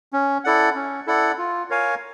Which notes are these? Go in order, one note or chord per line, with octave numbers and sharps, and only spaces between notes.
C#4
E4 A4 D5 F#5
C#4
E4 A4 D5 F#5
F4
A#4 C#5 F5 G#5